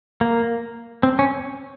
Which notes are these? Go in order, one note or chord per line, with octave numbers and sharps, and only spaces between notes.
A#3
C4
C#4